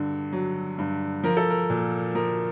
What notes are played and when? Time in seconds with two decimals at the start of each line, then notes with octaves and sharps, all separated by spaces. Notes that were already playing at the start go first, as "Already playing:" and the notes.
Already playing: G2 D3
0.33 F#3
0.78 G2
1.24 F3 A#4
1.37 A4
1.50 A#4
1.70 A#2
2.15 F3 A#4